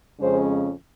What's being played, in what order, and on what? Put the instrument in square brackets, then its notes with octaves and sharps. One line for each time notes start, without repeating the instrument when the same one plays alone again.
[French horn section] F2 C#3 G#3 C#4 C5